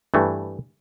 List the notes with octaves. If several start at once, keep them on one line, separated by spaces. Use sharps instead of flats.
G2 E3 A3